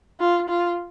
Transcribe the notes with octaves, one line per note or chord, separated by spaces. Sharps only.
F4
F4